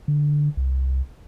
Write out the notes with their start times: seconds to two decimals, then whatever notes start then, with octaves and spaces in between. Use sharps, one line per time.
0.08 D3
0.57 C2